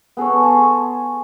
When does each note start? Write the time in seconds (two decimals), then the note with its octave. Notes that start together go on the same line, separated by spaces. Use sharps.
0.17 B3 G#4 A4 C#5
0.43 G#4 A5 C6 C#6